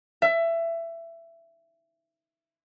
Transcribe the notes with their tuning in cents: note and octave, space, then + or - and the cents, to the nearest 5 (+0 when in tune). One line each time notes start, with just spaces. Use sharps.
E5 +20